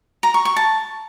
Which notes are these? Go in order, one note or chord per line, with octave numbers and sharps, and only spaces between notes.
A#5
C#6
C#6
A5